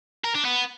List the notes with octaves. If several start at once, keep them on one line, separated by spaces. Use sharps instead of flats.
A#4
D4
B3